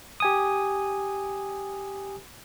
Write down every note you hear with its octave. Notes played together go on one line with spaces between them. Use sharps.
G4 G#5 D#6